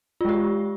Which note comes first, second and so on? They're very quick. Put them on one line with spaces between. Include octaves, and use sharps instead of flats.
F4 G#3 G4